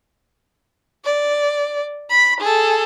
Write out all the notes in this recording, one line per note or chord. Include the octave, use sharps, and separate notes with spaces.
D5
B5 B6
G#4 A4